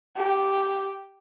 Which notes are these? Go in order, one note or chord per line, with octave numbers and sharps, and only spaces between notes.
G4